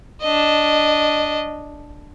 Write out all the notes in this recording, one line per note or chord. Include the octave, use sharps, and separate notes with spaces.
D4 D#5